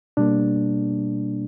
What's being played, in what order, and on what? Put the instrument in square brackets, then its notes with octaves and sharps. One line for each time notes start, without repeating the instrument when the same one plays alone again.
[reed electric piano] B2 G3 A#3 D4